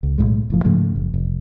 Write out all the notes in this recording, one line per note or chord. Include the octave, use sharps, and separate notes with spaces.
C#2
B1 E2 A2 G#3
F#1 A2 F3
G#2 C#3 F3 A3
F#1
F1